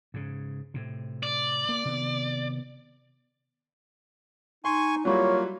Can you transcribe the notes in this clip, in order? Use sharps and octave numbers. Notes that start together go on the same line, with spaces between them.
G#2 C#3
A2 C3
D5
A#3
C3 D#3 B3
D#4 G#5 C6 C#6
F#3 G3 A#3 E4 F4 C#5